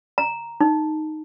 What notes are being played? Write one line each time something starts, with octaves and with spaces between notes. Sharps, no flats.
A#5
D#4